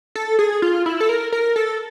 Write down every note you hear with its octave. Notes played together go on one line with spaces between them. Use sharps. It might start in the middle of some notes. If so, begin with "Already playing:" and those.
A4
G#4
F4
E4
A4
A#4
A#4
A4